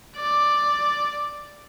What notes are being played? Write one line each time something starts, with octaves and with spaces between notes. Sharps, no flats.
D5